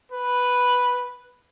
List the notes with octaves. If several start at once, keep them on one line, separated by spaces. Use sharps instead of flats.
B4